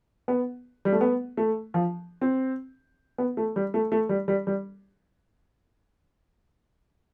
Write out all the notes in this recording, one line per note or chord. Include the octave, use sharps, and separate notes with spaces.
B3
G3
A3
B3
A3
F3
C4
B3
A3
G3
A3
A3
G3
G3
G3